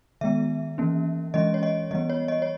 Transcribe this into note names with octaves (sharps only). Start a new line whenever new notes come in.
D#3 G#3 B3 E5
E3 A#3 C#4
E3 G#3 C#4 D#5
C#5
D#5
E3 G3 B3 D#5
C#5
D#5
C#5